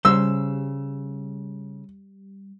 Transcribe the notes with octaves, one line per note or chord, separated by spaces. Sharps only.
C#3 G3 C5 E6